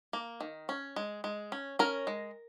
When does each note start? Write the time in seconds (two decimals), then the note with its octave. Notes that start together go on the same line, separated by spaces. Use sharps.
0.13 A#3
0.41 D#3
0.69 C#4
0.96 G#3
1.24 G#3
1.52 C#4
1.79 C#4 A#4
2.07 G#3